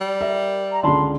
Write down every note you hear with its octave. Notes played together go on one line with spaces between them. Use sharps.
G3
A#4 E5
A#5
C#2 D3 D4 A5 B5 C6